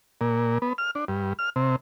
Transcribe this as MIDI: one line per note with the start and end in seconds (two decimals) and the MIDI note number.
0.21 0.58 46
0.62 0.73 59
0.78 0.91 89
0.95 1.05 62
1.08 1.33 43
1.39 1.50 89
1.56 1.76 48